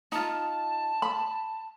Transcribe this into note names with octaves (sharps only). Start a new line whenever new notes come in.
D#4 F4 A5
B5